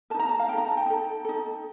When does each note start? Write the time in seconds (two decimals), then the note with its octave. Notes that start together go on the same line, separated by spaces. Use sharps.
0.10 A#4 A5
0.14 D#4
0.19 A#5
0.29 A5
0.39 F5
0.48 D#4 G5
0.53 A4
0.58 A#5
0.68 A5
0.77 G5
0.86 D#4 A4
1.25 D#4 A4